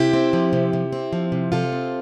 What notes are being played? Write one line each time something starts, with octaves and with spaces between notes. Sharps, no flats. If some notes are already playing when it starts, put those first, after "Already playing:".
Already playing: C3 E4 G4
C4
F3
C3
C3
C4
F3
C3
C3 F4 A4
C4